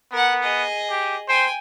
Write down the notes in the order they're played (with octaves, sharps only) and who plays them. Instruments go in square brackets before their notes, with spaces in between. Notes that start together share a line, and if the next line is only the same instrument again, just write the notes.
[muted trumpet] B3 [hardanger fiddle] A#4 F#5
[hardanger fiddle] G#4 D#5
[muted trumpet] G4
[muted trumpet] C5 [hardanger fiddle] G5 G#5